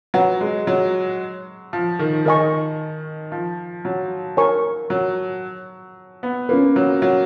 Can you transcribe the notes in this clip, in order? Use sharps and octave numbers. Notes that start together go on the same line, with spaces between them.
F#3 B4 F#5 A#5
G#3
F#3
F3
D#3
D#3 A#4 D#5 G#5 C#6
F3
F#3
A#4 C#5 G#5 C#6
F#3
B3
A#3 C#4 F4 B4
F#3
F#3